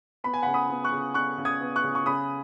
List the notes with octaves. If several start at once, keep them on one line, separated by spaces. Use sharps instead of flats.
B3 B5
G#5
C#3 F#5 B5
B5 D#6
B3
C#6 F#6
C#3
B3 C#6 F#6
C#3
D#6 G#6
B3
C#6 F#6
C#3
C#6
C#3 B5 D#6